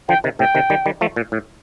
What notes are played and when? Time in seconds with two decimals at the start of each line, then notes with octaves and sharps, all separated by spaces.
0.09 D3 F3 G5
0.24 C3 D#3
0.39 A2 C3 G5
0.55 C3 D#3
0.70 D#3 G3
0.86 D#3 G3
1.01 F3 A3
1.16 A#2
1.32 A2